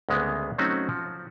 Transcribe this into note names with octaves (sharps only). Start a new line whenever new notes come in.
D2 C#3 G#3 A#3 B3
F#3 A3 C4 C#4 D#4 F#4
F3